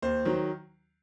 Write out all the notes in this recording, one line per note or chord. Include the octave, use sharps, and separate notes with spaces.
D#2 C5
D#3 F#3